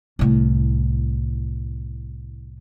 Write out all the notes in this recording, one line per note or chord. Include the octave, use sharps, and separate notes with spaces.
C2 A2